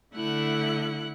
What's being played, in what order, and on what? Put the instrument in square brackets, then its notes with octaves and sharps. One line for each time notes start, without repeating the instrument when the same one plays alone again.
[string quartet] D3 A3 E4 F#5 F#6